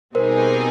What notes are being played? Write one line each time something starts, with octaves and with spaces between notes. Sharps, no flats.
B2 G3 C4 D#4 G#4 A#4 C5